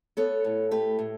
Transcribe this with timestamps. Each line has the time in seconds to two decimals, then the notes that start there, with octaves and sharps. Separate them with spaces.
0.17 B3 A4 C#5
0.44 A2
0.71 A3 G4 B4
0.99 A2